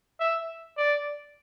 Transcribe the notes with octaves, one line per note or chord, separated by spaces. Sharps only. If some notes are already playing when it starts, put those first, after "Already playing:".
E5
D5